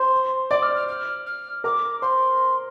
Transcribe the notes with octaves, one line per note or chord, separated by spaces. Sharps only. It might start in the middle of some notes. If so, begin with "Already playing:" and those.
Already playing: C5 C6
D5 D6
F6
F6
F6
F6
A#4 D6
C5 C6